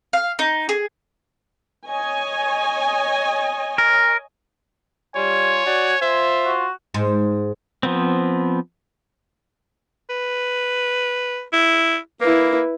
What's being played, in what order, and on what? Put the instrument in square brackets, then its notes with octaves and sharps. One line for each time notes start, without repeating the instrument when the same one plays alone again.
[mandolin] F5
D#4
G#4
[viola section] C#5 D#5 G#5
[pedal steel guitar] A#4
[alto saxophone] G3 [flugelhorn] F4 [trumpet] C#5 [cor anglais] G#5
[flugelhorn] F#4 [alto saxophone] D5
[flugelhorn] F4 [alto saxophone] C5 [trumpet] E5
[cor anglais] F#4
[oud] G#2
[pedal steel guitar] F3 B3 C4
[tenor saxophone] B4
E4
[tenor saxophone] A#3 [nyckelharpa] E4 B4